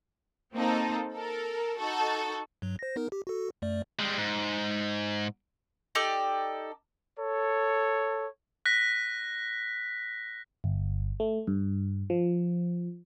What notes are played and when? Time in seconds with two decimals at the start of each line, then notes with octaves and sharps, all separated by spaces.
0.54 A#3 C4 D#4 A4
1.15 A4 A#4
1.78 D#4 F#4 A4
2.62 G2 F#3
2.79 C5 A#6
2.96 B3 D#4 A#4
3.12 G4
3.27 F#4 A4
3.62 F#2 A3 D5
3.99 G3 G#3
4.18 G#2
5.95 D#4 G4 A4 D5
7.18 A4 C#5
8.65 F#6 A#6 B6
10.64 G1
11.20 A3
11.47 G2
12.10 F3